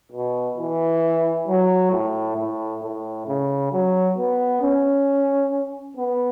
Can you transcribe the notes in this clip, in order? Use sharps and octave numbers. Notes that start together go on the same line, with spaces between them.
B2
E3
F#3
A2
A2
A2
C#3
F#3
B3
C#4
B3